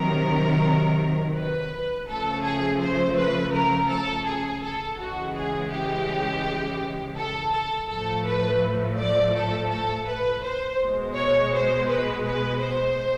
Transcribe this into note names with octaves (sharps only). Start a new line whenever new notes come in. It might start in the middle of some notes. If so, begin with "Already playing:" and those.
Already playing: C3 D#3 F#3 A#4
B4
C#3 F3 A3 A4
G#4
C5
B4
A#4
A4
G#4
A4
C#3 E3 G#3 F#4
G#4
G4
A4
A4
A2 F3 A3 A4
B4
D5
A4
A4
B4
C5
B2 G#3
C#5
C5
B4
B4
C5